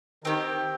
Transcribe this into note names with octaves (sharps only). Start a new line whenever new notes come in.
D#3 C4 G4